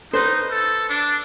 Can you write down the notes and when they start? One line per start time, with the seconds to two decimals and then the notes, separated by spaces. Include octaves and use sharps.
0.13 D#4 B4 C5
0.51 A4
0.89 D4